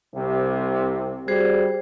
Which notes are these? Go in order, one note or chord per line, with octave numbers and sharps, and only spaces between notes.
C2 C3
G3 F#4 G#4 C5